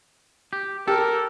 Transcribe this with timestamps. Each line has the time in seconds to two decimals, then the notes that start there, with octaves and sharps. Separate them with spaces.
0.53 G4
0.88 G4 A4 A#4